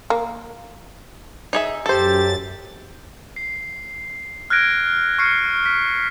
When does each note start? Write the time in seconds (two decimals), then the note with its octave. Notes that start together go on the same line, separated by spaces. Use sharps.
0.10 A#3
1.53 D#4 G#4 E5
1.86 F#2 G4 A4 C5 A6
3.36 C7
4.50 F6 F#6 G#6 A#6 D7
5.18 C#6 F6 C7 C#7
5.66 B6